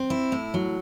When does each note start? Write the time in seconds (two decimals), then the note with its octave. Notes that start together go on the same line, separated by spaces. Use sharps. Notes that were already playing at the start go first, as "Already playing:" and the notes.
Already playing: C4
0.10 E4
0.32 A2
0.54 F#3